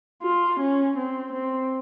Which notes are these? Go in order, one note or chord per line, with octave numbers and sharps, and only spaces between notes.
F4
C#4
C4
C4